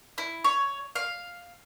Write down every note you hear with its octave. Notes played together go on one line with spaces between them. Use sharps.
E4
C#5
F5